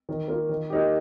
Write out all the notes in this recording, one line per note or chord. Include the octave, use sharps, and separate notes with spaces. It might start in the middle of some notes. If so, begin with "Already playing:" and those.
D#3
A#3 F4
D#3
A#3 D#4 G4